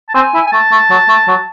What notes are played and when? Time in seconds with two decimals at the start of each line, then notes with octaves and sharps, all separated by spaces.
0.09 A5
0.14 C4 G#5
0.34 E4
0.47 G#5
0.52 A3 A5
0.71 A3
0.90 F#3
1.08 A3
1.28 F#3